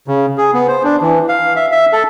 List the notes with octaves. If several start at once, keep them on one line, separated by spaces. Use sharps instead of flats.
C#3
G#4
B3
C5
D4
E3
F5
E5
E5
A4